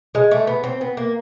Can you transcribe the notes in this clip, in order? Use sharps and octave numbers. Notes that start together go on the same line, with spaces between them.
G#3
A3
B3
C4
B3
A#3